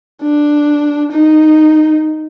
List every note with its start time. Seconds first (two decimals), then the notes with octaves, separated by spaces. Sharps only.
0.22 D4
1.11 D#4